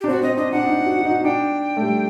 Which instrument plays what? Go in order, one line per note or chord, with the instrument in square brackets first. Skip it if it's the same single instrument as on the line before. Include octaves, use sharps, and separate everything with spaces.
[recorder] G4
[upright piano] D4
[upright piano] C4 [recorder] F#4
[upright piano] C4 [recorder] D#5
[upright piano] D4 [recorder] D#5
[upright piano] D4 [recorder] F#5
[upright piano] D#4
F#4
F#4
D#4
[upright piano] D4 [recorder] G5
[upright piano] A3
G3